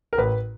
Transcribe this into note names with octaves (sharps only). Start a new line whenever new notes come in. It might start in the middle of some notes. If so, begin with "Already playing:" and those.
A#4
A1 B4